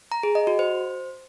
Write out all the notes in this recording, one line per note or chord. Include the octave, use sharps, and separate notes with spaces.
A#5
G#4
D#5
F#4
C5